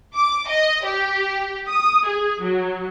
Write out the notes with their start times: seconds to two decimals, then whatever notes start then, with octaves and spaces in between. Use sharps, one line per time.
0.14 D6
0.47 D#5
0.84 G4
1.68 D#6
2.06 G#4
2.41 F#3